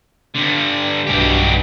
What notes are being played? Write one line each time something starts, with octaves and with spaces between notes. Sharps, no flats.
G2 D3
B1 G2 B2 G4